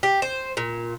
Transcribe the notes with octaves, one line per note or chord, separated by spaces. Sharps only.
G4
C5
A#2